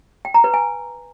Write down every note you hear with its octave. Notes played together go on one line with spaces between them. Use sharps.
G5
A#5
B4
G#5